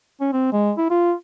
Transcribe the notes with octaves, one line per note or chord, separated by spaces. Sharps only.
C#4
C4
G#3
E4
F4